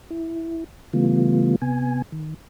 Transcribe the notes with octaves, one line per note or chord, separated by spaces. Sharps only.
E4
C#3 E3 G3 A3 B3 F4
C3 B3 G#5
D#3